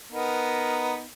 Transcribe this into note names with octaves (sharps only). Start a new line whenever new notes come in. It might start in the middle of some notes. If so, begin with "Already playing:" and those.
B3 D#4 A#4